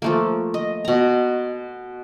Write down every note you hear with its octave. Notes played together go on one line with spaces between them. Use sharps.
F3 A3 A#3
D#5
B2 A#5